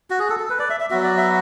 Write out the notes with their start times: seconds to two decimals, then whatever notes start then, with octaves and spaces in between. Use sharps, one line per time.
0.10 F#4
0.19 G#4
0.30 A4
0.40 A4
0.50 B4
0.59 D5
0.70 E5
0.80 E5
0.90 F#3 B3 F#4 E5
1.03 D5
1.17 E5